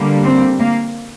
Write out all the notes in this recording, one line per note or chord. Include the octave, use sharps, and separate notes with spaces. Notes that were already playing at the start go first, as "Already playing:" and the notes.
Already playing: D3 G3 A#3
C4
A#3